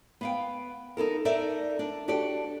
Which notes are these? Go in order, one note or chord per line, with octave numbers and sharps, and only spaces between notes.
B3 F5 G5
D#4 F4 A4 A#4
D#4 A4 A#4 D5 E5
D4
D4 F#4 G4 A4 D5